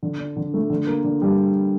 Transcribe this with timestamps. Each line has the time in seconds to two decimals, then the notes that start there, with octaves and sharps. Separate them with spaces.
0.03 D3
0.19 D4
0.36 D3
0.54 A3
0.70 D3
0.87 A#3
1.04 D3
1.22 G3